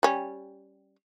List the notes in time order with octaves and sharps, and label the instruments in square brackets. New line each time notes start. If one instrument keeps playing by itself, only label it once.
[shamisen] G3 C#4